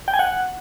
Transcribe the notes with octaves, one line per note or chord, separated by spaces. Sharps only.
G5
G#5
F#5